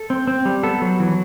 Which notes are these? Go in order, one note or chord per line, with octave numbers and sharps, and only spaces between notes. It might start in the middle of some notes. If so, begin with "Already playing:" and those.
Already playing: A4
C4
C4
G3
B3 A4
F#3
E3